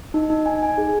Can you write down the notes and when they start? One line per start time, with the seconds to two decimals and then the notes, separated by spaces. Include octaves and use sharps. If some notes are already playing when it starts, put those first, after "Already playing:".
0.14 D#4
0.30 D#4
0.46 G#5
0.63 G#5
0.78 G#4